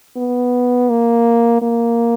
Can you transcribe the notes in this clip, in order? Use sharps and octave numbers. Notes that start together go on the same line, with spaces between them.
B3
A#3
A#3